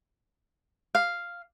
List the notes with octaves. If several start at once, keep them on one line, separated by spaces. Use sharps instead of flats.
F5